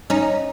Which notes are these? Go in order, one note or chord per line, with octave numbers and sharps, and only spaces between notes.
C#4 D#4